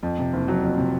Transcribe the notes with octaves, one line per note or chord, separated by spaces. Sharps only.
F2
C3
F#1
F#3
F2
C3